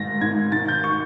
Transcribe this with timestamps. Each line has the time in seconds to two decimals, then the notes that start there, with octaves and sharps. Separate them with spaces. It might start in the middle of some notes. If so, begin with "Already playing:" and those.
Already playing: G#2 D#3 A6 A#6
0.21 G#2 G#6
0.52 D#3 A6
0.68 G6
0.84 C#6